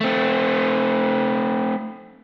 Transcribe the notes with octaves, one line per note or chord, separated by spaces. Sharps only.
A3 C4